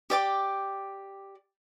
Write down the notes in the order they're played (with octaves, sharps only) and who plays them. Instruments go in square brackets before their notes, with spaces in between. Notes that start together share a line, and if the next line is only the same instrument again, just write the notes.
[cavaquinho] G4 D5 G5 D6